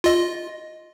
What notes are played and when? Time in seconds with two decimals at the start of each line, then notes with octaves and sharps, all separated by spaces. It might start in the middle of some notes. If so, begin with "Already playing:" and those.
0.04 F4 D#5